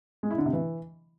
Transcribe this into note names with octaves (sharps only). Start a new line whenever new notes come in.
G#3
E4
D3
C3
E3